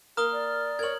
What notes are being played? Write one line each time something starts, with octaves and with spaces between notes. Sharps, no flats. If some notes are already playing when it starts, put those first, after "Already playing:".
A#3 A#4 A#5 D#6 F6 G7
D5
A#4 C#5 G#6 F#7